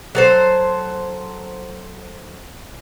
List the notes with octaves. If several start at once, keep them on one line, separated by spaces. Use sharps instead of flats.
F#3 A4 C5